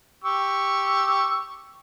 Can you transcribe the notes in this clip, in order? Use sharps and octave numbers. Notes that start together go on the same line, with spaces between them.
G4 C#6 E6